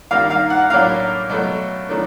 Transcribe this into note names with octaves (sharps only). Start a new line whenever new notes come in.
G2 D#3 G3 A#3 F5
F5
F#5
A2 F#3 A#3 D4 F5
B2 F#3 A3
D#3 F#3 A3 D4